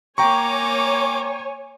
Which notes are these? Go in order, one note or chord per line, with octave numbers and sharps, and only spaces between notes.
A#3 C#5 G5 G#5 A#5 C#6 D6